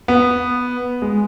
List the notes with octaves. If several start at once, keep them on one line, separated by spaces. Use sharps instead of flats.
B3
G#3